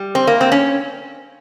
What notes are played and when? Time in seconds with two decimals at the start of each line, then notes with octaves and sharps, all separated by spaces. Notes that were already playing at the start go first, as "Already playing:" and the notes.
Already playing: G3
0.15 C4
0.27 A#3
0.41 C4
0.52 C#4